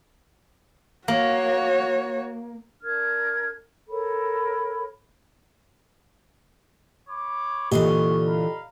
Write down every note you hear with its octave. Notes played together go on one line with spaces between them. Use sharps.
A#3 F#4 C#5
D4 A#4 F6 G#6
A4 A#4 C#5 B5
C#5 B5 D6
A#2 D3 E3 F4 G4 D#5 C#6
A#4 F5 B5